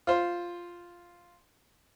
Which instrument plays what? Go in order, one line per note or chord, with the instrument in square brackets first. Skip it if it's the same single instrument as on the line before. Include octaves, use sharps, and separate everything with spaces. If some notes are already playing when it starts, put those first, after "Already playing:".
[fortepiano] F4 C5